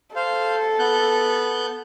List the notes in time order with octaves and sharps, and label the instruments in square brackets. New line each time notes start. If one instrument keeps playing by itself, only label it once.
[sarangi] A4 [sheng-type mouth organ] C5 F5
[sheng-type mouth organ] B3 F#6 G6